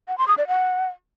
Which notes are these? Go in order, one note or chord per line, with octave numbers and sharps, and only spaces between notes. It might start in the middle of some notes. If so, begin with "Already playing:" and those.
F#5
C6
D#6
D5
F#5